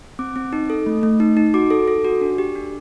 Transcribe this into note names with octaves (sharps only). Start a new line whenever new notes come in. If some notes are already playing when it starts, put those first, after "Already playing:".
C4 D6
C4
D#4
A4
A3
A3
D#4
D#4
F#4 D6
A4
A4
F#4
D4
G4
D4